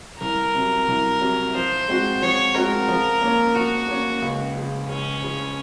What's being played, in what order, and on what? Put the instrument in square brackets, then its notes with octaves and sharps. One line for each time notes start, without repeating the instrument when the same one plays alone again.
[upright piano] C2 [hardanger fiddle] A#4
[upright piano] C3 F#3
C2
C3 F#3
[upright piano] F3 [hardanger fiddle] C5
[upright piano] G#3 C4 F#4
[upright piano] F3 [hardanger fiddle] C#5
[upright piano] G#3 C4 F#4 [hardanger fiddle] A#4
[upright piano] F3
A#3 C#4
[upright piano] F3 [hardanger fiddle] F#4
[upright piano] A#3 C#4
C#2
C#3 F3
[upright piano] C#2 [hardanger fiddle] C#4
[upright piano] C#3 F3